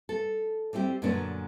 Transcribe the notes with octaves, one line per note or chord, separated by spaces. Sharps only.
A4
G3 C4 E4 G4
F#2 A#2 D3 B3 C#4 D4